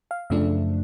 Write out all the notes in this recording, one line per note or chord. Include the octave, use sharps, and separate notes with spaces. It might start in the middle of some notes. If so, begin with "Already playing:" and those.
F5
F#2 C#3 F3 A3 D4 E5